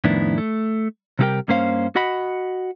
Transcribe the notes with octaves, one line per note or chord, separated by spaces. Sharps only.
F2 A2 D#3 B3 D4 E4
A3
C3 G3 E4 G4 A#4 G5
G2 A#3 C#4 C5 F5
F#4 D#5 F#5 B5